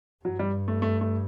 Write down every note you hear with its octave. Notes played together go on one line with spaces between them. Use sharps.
G2 F#3
G3
A3
A3
A3